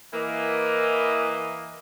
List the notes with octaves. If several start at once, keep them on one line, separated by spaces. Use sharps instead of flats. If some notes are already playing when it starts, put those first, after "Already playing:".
E3 A#3 D#5